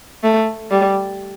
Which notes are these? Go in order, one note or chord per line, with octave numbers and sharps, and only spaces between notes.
A3
G3